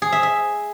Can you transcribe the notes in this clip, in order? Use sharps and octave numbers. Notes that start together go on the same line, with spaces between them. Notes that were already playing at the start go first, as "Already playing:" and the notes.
G#4
E5
E5